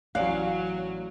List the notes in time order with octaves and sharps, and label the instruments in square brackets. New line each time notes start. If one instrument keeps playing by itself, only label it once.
[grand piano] A1 G#5 F#6 [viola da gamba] F#3 [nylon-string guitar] C#5 D5 [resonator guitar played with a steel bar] F5